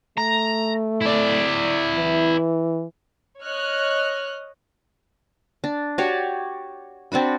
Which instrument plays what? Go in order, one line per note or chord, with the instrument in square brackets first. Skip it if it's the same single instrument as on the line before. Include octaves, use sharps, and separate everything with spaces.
[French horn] A3 [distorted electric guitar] A#5
[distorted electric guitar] E4 D5
[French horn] E3
[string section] C#5 D#5 F6 F#6
[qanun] D4
F#4 G4 C#5 D5
C4 D4 F#4 B5